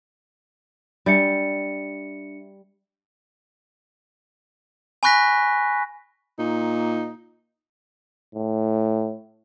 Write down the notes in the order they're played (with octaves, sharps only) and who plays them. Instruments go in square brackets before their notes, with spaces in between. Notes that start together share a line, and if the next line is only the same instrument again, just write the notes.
[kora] G3 [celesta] D4 E5 C#7
[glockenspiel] G#5 B5 C#6 F#6 A#6 B6
[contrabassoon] A#2 [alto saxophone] D#4
[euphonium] A2